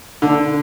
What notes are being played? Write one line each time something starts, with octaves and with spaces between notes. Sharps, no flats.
D3